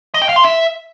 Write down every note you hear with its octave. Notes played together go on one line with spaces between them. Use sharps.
D#5
G5
F5
C6
E5